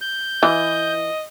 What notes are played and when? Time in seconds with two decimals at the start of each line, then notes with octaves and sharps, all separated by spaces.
0.01 G6
0.43 E3 D#5